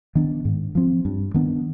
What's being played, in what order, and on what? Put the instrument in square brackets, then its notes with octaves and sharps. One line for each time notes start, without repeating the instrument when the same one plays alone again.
[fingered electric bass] D#3 B3 D4
G#2
F3 C4
G2
D#3 B3 D4